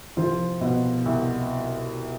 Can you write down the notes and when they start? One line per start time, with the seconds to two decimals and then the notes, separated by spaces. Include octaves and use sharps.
0.16 C2 F3 F4
0.61 B2
1.05 C2